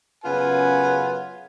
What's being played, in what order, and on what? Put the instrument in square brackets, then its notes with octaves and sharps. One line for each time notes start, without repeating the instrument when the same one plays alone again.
[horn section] F#2 C#3 B3 F4 B4 G#5